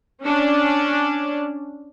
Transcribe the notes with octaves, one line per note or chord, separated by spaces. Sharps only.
C#4 D4